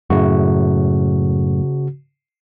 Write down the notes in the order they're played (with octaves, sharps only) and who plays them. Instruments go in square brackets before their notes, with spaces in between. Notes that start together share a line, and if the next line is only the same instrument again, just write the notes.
[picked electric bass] F#2 A2 [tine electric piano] C#3 F#4